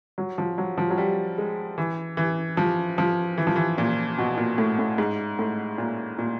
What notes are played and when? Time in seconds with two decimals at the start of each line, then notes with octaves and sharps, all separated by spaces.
0.18 F#3
0.38 F3
0.58 F#3
0.78 F3
0.91 F#3
0.98 G3
1.38 G#3
1.78 E3
2.17 E3
2.57 F3
2.98 F3
3.38 E3
3.47 F3
3.56 E3
3.78 A#2
4.18 B2
4.37 A#2
4.58 A2
4.79 A2
4.98 G#2
5.39 A2
5.78 A#2
6.19 A#2